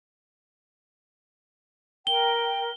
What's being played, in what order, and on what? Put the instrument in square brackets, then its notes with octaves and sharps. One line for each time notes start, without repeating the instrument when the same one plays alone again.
[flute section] A#4 G5 [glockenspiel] G7